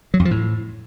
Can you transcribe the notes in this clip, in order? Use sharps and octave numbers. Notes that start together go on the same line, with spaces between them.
F#3
F2
F3
A2